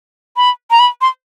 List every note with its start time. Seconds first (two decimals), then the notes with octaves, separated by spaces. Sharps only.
0.37 B5
0.71 A#5
0.80 B5
1.01 C6